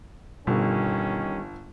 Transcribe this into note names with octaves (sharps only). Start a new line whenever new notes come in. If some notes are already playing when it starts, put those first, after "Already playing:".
G1 B2 D#3 G3 C#4 G4